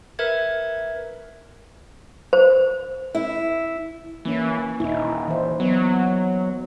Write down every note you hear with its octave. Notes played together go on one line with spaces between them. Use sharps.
A#4 B4 E5 G#6
C5
E4
E3 A#3 C#4
D#1 D#4 E4
E3 C5
F#3 B3